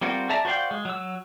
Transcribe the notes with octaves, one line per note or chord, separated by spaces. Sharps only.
G3 C4 F4 F#4 A#4
G#4 D5 E5 A5 A#5
F#4 C5 D5 F5 G5
G#3
F#3 E6